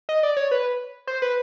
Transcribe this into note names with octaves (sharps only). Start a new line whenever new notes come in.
D#5
D5
C#5
B4
C5
B4